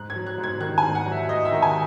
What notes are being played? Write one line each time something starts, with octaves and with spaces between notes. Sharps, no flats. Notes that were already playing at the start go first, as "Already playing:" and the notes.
Already playing: G#2 F#6
G#6
F#3
F#6
G#2
G#6
D#3 F#6
G#2 G#5
F#5
F#3
E5
G#2 D#5
E5
D#3
G#5